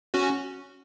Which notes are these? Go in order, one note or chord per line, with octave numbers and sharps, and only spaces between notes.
C#4 F#4